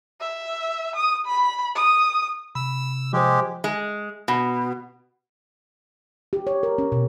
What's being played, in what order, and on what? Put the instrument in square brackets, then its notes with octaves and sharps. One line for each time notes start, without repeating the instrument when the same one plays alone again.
[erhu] E5
D#6
B5
D#6
[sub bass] C3 [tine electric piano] B5 [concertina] E6
[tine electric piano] F3 C5 [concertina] G#3 G4
[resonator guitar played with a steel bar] G#3
B2
[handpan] G4
C#5
A#4
C#4
B2